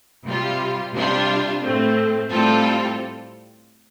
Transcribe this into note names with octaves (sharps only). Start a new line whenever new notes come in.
C3 G3 F4
C3 G3 D4 F4
A2 A3 C4
A2 G3 C4 F4 A4